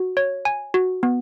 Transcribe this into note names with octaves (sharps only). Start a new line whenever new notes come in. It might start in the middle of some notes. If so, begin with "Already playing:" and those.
Already playing: F#4
C#5
G#5
F#4
B3